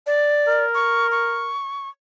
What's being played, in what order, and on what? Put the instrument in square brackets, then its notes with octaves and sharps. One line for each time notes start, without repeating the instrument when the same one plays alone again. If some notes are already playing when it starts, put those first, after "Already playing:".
[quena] D5
[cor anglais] A#4
[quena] C#6
C#6